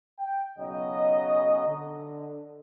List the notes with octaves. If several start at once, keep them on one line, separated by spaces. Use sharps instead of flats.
G5
B1 C#3 F#3 D#5
D3